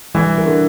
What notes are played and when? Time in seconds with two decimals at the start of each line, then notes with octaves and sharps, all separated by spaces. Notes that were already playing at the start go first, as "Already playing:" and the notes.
0.15 E3 G3
0.38 A#4
0.45 D3